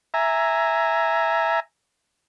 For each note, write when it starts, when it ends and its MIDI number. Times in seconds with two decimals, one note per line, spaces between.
0.14 1.60 76
0.14 1.60 80
0.14 1.60 82